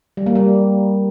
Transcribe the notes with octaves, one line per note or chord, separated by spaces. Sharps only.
G3
A#3
G3